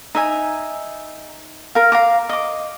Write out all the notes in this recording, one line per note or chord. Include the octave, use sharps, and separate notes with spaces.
D#4 E5 G#5
A#4 F5
F5 A#5 D6
D#5 D6